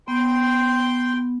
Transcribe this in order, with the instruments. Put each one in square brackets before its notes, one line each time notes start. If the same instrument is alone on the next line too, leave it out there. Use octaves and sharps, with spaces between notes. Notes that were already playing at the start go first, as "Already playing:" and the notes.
[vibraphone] B3 [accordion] G5 C6